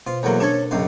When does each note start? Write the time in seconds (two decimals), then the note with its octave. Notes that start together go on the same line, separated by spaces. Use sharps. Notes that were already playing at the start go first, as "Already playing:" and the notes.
0.07 B2 F4 C5
0.23 E2 F#3 A#3 A4 A#4 C#5
0.40 C#4 D4 A4 C#5
0.71 C#2 F#2 F5